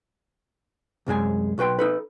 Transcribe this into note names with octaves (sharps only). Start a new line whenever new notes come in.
C2 F#2 G#3 G#5
B1 F#4 B4 G5 C6
D#4 A4 B4